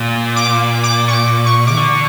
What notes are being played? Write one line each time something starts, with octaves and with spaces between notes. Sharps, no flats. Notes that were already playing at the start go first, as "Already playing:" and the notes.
Already playing: A#2
D6
D6
C#6
D6
C#6
D6
E3
D3 C#6